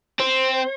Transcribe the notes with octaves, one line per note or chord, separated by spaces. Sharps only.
C4 C5